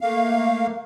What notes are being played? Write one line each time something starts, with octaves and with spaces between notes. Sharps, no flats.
A3 A#3 F5